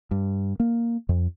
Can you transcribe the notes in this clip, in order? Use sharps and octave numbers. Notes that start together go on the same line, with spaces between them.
G2
A#3
F2